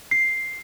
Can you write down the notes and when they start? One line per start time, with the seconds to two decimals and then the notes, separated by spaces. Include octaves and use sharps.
0.11 C7